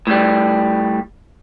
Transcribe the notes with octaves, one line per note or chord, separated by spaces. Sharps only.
A2 G3